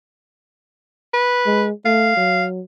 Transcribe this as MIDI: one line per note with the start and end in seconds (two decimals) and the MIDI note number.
1.14 1.65 71
1.46 1.72 56
1.85 2.13 57
1.85 2.44 77
2.17 2.61 54